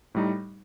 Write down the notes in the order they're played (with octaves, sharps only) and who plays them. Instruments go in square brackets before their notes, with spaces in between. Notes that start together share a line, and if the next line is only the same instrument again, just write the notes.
[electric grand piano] A2 G3 D#4